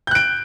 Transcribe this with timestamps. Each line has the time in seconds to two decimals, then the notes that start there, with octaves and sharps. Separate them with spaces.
0.07 G6
0.11 F#6
0.15 D7